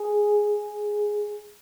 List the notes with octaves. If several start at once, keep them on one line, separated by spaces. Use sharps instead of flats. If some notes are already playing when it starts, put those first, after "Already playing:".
Already playing: G#4